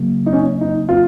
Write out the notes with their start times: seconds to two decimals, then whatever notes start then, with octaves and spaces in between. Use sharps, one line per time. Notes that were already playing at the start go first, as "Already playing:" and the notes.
Already playing: C#3 F#3 A#3
0.26 D#4
0.33 C#4
0.61 D#4
0.89 F4